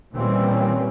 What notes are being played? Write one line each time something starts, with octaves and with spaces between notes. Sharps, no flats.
A#2 D#3 E3 G3 C4 C#4